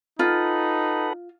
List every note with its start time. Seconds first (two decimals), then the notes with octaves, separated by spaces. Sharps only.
0.19 D#4 F4 A4 B4 F#5